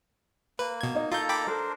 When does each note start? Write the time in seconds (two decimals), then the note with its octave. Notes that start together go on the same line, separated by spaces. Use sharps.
0.59 A#3 B4
0.81 B2 G#6
0.95 D#4 D#5
1.12 A#3 F4 A4 A#5 G6
1.29 G5 B5 D6
1.47 D4 A4 A#4 C5